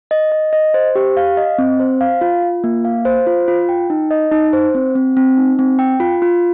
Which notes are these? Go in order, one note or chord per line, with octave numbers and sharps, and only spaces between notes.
D#5
D#5
D#5
C5
G4
F5
D#5
C4
C5
F5
F4
F4
A#3
F5
C5
F4
F4
G5
D#4
D#5
D#4
C5
C4
C4
C4
D#4
C4
G5
F4
F4